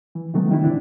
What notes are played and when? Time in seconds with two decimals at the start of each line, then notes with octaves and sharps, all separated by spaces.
0.15 E3
0.34 C3 D#3 F#3 G#3 A3 B3
0.51 D#3 E3 G3 D4 E4
0.63 A2 D3 C4 D4 E4